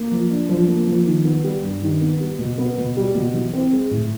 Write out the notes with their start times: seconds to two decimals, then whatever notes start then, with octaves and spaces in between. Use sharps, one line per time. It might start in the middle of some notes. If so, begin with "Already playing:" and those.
Already playing: A#3
0.12 F3
0.30 D4
0.49 F3
0.68 A#3
0.87 F3
1.06 D#3
1.25 B3
1.44 G3
1.63 G2
1.82 D#3
2.01 B3
2.20 G3
2.39 B2
2.58 B3
2.78 B2
2.97 G3
3.15 B2
3.34 E3
3.54 C4
3.73 G#3
3.91 A2